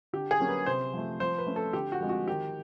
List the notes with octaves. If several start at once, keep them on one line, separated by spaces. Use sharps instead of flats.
D3 G4
G#4
F#3 A#3 C#4
B4
C3 C5
F3 A3
F3 C5
B4
A3 C#4
A4
D3 G4
F#4
F3 G#3 C4
F#4
D#3 G4